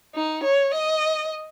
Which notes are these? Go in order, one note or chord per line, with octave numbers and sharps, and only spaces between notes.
D#4
C#5
D#5